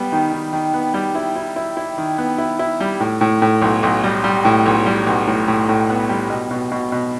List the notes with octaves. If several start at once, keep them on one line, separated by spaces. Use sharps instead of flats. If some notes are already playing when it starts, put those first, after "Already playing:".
Already playing: G3 B3
D#3
D#3
D#3
B3
G3
E4
E4
E4
E4
D#3
B3
E4
E4
G3
A2
A2
A2
B1
B1
G3
G3
A2
B1
G3
B1
A2
A2
A2
B3
G3
B2
B2
B2
B2